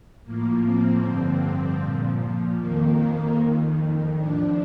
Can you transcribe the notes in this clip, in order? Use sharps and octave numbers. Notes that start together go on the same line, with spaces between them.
A2 F3 A#3
C4
G2 D3 F3
A#2 F3
F2 D#3 A#3
F2 D#3
A2 F3 D4